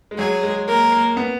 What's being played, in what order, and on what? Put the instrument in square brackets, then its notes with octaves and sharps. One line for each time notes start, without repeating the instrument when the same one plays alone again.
[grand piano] G#3
[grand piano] F#3 [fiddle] G#4
[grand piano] G#3
[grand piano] A#3 [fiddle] A#4
[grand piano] A#3
B3